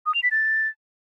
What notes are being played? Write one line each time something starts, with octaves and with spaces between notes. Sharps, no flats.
D#6
F7
B6
A6